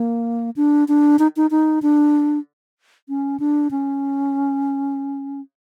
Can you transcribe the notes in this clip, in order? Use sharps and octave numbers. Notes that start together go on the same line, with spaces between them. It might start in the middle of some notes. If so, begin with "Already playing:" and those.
Already playing: A#3
D4
D4
D#4
D#4
D#4
D4
C#4
D4
C#4